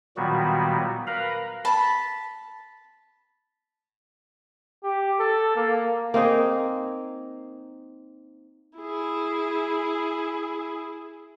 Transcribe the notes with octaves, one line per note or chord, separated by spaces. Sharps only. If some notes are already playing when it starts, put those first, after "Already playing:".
A#2 D#3 F#3 G3 B3 F#4
A#4 B4 F5 A#5 B5
A5 B5
G4
A4
A#3
A#3 C4 D#4 G#4
E4 G#4